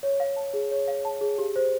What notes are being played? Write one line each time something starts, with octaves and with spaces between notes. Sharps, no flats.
C#5
F5
A5
G#4
C#5
F5
A5
G#4
G4
C5